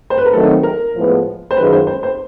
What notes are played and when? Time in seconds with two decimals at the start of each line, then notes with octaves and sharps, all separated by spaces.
0.10 C5
0.18 B4
0.26 A#4
0.33 D#3 F#3 A3 C4 D#4 A4
0.63 A#4
0.95 A2 F3 G#3 B3
1.51 C5
1.56 F#2 D#3 G#3 C#4 F4 B4
1.73 C5
1.87 C5
2.03 C5